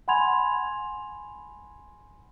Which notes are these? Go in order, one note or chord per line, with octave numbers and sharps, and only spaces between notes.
F#5 G#5 B5 C6 G#6 F7